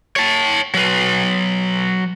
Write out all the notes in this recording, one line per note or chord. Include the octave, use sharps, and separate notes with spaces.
C#5 A5
F#3 B4